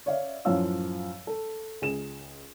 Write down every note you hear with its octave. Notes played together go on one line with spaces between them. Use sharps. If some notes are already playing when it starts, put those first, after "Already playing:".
C#5 D5 E5 F5
F#2 A2 F3 C#5 F5 E6
A4
C#2 G#4 E7